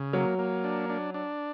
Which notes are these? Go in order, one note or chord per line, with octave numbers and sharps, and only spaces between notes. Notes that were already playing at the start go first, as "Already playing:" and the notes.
Already playing: C#3
F#3 A#3
A#3
D4
D4
D4